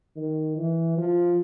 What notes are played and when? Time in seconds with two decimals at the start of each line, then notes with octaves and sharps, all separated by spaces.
0.16 D#3
0.57 E3
0.98 F3